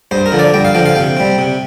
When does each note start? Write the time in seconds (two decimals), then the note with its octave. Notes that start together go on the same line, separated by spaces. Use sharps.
0.11 G2 C5
0.26 A#4
0.32 D3 F3
0.39 D5
0.54 G2 G5
0.65 F5
0.75 D3 F3 G5
0.86 F5
0.96 C3 G5
1.17 G3 C4
1.38 C3